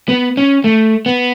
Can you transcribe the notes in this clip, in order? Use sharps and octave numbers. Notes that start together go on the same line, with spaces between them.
B3
C#4
A3
B3